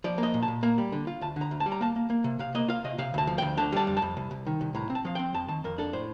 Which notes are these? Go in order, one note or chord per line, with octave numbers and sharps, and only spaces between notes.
F3 D5
A#3
D#5
A#2
A5
A#2
A#3 A#5
G3
D3
F4
D2 A5
D3 A#5
D2
A5
G3
A#5
A#3 A5
A#3
A#3
C3
C3 F5
A#3 D#5
F4 F5
C3 D#5
C3 F5
D2 A5
F3
D2 G5
D3 A5
G3 A5
F2
A5
F2
C2
C2
D#3
C2
A2 A#5
C4
A5
F3 F5
C4 G5
F2 A5
D#3 A5
F2 A#4
D4 A4
A2 C5